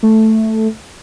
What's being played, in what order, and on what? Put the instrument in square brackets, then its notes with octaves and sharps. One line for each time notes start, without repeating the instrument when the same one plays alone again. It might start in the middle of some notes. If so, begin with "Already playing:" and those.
[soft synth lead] A3